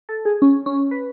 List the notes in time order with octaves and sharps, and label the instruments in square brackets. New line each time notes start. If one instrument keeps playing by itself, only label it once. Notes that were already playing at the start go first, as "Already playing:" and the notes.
[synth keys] A4
G#4
C#4
C#4
B4